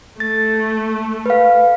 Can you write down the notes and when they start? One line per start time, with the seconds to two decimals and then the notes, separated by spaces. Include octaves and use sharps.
0.20 A3 A6
1.26 B4 F5